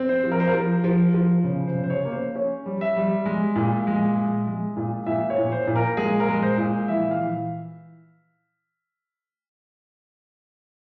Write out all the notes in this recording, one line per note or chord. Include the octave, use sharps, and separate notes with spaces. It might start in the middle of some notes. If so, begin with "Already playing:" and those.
Already playing: C4
C5
F3
A#4
C5
A#4
F3
F3
F3
C#3
C5
C#3
C5
C#5
A#3
C5
C#4 C#5
G3
E5
G3
G#3
A#2
G#3
G#3
G#3
A#2
A#2 E5
C#5
A#2
C5
A#2
A#4
G#3 G#4
A#4
G#3
C5
A#2
E3 E5
F5
E3